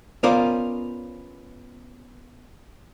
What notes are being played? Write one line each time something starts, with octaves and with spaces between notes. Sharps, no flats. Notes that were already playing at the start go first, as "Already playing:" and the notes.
B3 C#4 F4 A#4 C5 D5